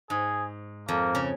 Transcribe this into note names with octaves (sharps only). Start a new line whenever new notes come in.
G#2 G#4
F2 A#3
C#3